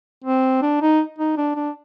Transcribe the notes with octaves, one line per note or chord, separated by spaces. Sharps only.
C4
D4
D#4
D#4
D4
D4